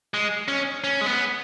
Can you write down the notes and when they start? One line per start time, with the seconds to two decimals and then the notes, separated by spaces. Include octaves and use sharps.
0.14 G#3
0.48 C#4
0.84 C#4
1.01 G#3
1.06 B3